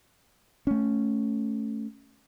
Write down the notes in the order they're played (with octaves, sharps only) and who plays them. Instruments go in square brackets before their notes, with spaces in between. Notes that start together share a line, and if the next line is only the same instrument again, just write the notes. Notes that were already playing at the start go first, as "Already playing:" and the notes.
[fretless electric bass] A3 C#4